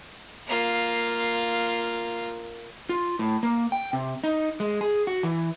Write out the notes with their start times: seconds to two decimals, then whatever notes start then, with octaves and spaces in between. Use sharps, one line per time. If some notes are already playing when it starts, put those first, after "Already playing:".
0.48 A#3 F4
2.89 F4
3.19 A2
3.43 A#3
3.72 G5
3.93 C3
4.24 D#4
4.60 G#3
4.81 G#4
5.07 F#4
5.23 E3